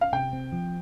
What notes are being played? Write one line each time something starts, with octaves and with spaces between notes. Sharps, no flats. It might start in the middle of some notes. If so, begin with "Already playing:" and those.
F5
C3 G5
C4
F3